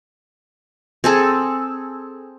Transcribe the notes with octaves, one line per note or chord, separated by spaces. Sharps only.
C4 G#4 A4